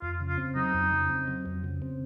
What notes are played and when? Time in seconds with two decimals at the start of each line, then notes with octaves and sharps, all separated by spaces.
0.02 F2 F4
0.20 C#3
0.28 F4
0.38 C4
0.56 F#3 D#4
0.74 F2
0.92 C#3
1.09 C4
1.28 F#3
1.46 F2
1.64 C#3
1.82 C4